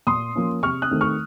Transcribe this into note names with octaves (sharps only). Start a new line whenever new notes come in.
A#2 C6 D#6
F3 A#3 C#4
C3 C#6 F6
D#6 F#6
D#3 A3 C4
C#6 F6